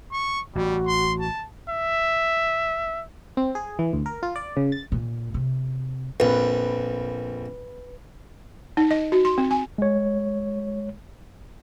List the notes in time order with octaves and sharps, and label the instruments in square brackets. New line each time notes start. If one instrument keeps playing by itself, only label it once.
[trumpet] C#6
[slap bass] A1 [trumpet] G3 [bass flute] F#4
[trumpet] C6
A5
E5
[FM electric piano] C4
G#4
E3
D2
A#4
F4
D5
C#3
A6
[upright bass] A#2
C3
[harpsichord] A#1 F2 [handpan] B4
[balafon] D#4
D#5
F#4
C6
C4
G#5
[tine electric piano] G#3 C#5